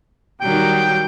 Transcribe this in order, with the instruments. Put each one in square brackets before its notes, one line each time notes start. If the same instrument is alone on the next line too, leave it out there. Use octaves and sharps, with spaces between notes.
[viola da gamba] D#3 F#3 G3 [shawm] G5